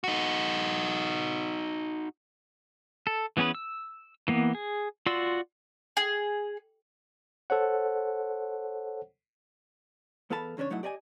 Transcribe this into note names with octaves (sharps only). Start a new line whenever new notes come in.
D#4 F#4
A4
E3 B3 C#4 G#4 B4
E6
E3 A#3 B3
G#4
F4 F#4 D5 C6 E6
G#4
A4 C5 C#5 F#5
E2 B3 A4 F5 A5 B5
E2 C#3 C#4 D4 C#5
B1 F#3 A3 D#4 E4 F#5
G4 D5 D#5 G5 G#5